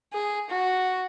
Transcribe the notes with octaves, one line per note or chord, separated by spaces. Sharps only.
G#4
F#4